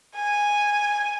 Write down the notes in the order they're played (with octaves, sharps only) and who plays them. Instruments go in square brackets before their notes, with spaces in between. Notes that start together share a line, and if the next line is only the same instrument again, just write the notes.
[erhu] G#5